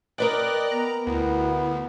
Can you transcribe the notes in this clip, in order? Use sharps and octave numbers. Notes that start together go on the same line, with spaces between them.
A#4 B4 D5 D#5 G5 F#6
B3 A#5
D2 B3 E4